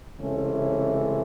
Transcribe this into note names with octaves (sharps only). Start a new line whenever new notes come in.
C#2 C3 E3 A3 C4 C#4